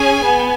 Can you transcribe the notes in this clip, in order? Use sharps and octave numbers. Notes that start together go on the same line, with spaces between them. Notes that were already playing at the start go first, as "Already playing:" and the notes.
Already playing: C#4 G#4 G#5
B3